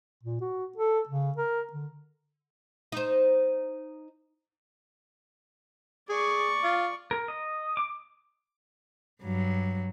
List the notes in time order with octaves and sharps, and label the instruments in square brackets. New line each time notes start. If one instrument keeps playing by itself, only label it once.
[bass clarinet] A#2
F#4
A4
C#3
A#4
D3
[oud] D#4 C5
[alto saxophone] G#4 [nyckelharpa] D5 C#6
[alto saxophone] F4
[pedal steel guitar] A#4
D#5
D6
[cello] G2 F#3